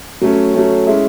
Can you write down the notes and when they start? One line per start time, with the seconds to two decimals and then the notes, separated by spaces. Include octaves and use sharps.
0.21 F#3 A3 C#4
0.54 F#3 A3 C#4
0.87 G#3 C#4 E4